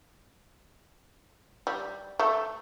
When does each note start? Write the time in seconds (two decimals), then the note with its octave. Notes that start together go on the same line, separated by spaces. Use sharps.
1.67 G3
2.19 A3